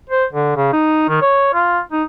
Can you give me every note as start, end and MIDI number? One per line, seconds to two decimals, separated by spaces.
0.10 0.25 72
0.33 0.54 50
0.56 0.72 49
0.73 1.08 63
1.09 1.19 51
1.22 1.52 73
1.54 1.79 65
1.92 2.04 63